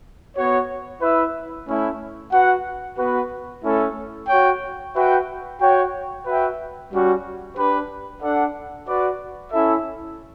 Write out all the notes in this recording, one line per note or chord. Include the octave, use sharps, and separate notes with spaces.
B3 F#4 C#5
E4 B4 E5
A3 C#4 E4
F#4 B4 F#5
B3 F#4 B4
A3 C#4 E4 A4
F#4 C#5 G5
F#4 B4 E5 G5
F#4 C#5 G5
F#4 B4 E5 G5
G3 C#4 F#4
D4 G4 B4
D4 A4 D5 F#5
F#4 B4 D5
C#4 E4 A4 E5